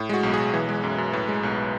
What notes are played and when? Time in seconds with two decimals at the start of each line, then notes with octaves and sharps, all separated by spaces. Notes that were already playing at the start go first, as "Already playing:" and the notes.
Already playing: A2
0.09 G#3 F#4
0.23 B1
0.34 B1 G#4
0.54 E3
0.69 G#3
0.84 F#2
0.98 F#2
1.13 A2 B4
1.28 G#3
1.43 B1